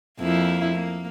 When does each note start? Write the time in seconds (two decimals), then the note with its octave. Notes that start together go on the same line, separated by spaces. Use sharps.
0.19 F2 A#3 E4
0.72 A#3